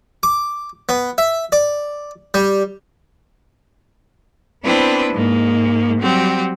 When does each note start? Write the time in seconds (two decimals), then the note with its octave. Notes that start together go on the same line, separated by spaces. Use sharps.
0.23 D6
0.89 B3
1.18 E5
1.52 D5
2.34 G3
4.64 B3 C4 D4 E4 B4 C5
5.13 G#2 G#3 A#3
6.00 F#3 G3 C4 F#4 G4